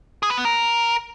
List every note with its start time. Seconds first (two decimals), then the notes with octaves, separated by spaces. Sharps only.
0.23 G#4
0.30 B4
0.37 B3
0.45 A#4